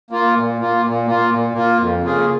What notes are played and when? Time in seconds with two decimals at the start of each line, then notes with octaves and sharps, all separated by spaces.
0.11 A#3 F4
0.34 A#2
0.59 A#3 F4
0.83 A#2
1.06 A#3 F4
1.29 A#2
1.53 A#3 F4
1.78 F2
2.01 C#3 A#3 F4 G#4